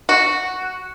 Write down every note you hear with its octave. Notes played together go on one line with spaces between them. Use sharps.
F#4